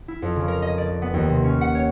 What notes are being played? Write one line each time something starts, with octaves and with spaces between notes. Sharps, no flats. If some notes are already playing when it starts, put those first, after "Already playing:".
E4
F2
C#3
A#4
D#5
D5
B3
D#2
C3
C#4
F#5
C#5